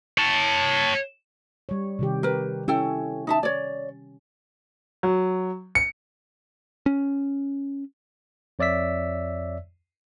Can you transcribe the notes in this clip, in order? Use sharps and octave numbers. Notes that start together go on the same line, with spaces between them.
C#5 A5
G3 C#5
C3 D#3 G4
A#4 B4
C#4 E4 A4 G5
D#4 E5 A5
C#5 D5
F#3
C#7
C#4
F2 C#5 D5 E5 E6 B6